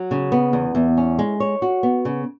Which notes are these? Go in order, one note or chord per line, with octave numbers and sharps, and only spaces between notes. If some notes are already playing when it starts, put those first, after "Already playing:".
Already playing: F#3
C#3
B3
E2
E2
C#4
G#3
C#5
F#4
B3
C#3